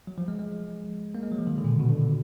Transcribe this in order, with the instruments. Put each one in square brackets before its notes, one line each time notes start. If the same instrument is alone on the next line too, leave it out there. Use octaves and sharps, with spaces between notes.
[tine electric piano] F#3
F3
G#3
G#3
A#3
G#3
F#3
F3
D#3
D3
A#2
B2
B2
D3
D3